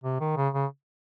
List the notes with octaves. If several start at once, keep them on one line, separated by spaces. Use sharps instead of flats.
C3
D#3
C#3
C#3